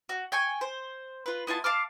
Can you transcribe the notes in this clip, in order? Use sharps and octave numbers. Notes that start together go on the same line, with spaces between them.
F#4
G5 G#5 C#6
C5
F4 B4
B3 E4 F4 A5
F5 A5 D6 F6